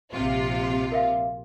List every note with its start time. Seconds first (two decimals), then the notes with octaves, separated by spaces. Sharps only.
0.12 A#1 C3 F4
0.92 A#4 E5 F5